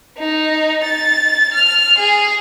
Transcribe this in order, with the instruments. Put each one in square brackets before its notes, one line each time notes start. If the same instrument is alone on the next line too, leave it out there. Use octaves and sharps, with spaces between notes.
[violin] D#4
A6
F6
G#4